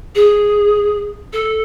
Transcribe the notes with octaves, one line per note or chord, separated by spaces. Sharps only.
G#4
A4